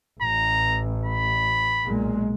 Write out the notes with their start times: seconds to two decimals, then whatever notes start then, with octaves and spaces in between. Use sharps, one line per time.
0.22 A1 A#5
1.05 B5
1.86 B1 A#2 G#3